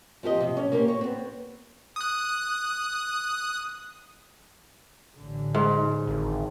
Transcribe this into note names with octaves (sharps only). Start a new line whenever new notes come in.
F3 C4 G4 D#5
C3
C#4
A#3 C4 C#4 G4
C#5
B3 C4
D#6 F#6
A1 D3
G#2
G#1